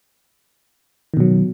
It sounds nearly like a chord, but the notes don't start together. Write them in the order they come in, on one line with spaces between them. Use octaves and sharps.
D#3 B2 F#3